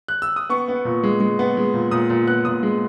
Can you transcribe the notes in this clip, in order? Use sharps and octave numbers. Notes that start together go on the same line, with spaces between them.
F#6
E6
D#6
B3 C#6
B3
A#2
G#3
G#3
B3
G#3
A#2
A#2 D#6
A#2
B3 F#6
A#2 D#6
G#3